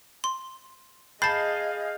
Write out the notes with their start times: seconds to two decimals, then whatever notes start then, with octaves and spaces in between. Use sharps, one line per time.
0.24 C6
1.22 G#4 D#5 F5 A5 B5 G6 A6 C7